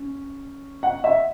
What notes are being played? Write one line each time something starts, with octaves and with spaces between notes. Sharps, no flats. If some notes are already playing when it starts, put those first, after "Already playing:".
Already playing: C#4
F#5
E5